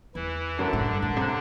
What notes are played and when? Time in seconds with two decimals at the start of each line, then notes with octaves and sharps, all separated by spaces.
0.15 E2 E3 E4
0.58 F#2 D3 D4
0.73 A2
0.87 G2
1.01 A2 D3 D4
1.17 C3